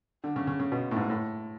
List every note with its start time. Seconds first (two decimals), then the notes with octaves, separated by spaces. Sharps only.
0.24 D3
0.36 C#3
0.47 C#3
0.60 C#3
0.72 B2
0.91 A2
0.96 G#2
1.10 A2